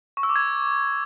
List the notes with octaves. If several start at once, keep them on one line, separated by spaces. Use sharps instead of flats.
C#6
E6
D6
G#6